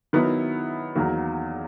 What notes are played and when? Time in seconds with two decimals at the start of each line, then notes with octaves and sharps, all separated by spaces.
0.13 D#3 F#3 B3 E4
0.95 E2 D#3 F#3 A#3